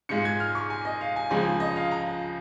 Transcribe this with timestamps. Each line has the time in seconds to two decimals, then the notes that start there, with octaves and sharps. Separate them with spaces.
0.09 G#2 G#3 F4 C#7
0.25 G#6
0.40 F6
0.55 C#6
0.70 G#5
0.85 D#5
1.01 F5
1.16 G#5
1.31 C#2 C#3 F3 G#3 G#5
1.60 D#5
1.76 F5
1.91 A#5